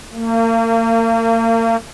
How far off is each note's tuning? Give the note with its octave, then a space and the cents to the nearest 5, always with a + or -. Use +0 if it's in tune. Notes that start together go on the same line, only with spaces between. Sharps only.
A#3 -40